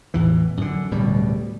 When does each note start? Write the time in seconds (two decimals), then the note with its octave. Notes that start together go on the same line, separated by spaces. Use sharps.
0.14 A1 E2 E3
0.57 F#2 D3
0.91 D1 B2 G3